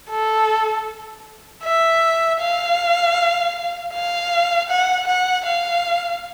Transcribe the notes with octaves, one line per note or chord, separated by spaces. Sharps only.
A4
E5
F5
F5
F#5
F#5
F5